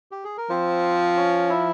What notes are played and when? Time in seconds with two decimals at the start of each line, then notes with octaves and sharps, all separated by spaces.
0.11 G4
0.24 G#4
0.37 A#4
0.50 F3 C4 C5
1.16 C#4 C#5
1.50 E4 E5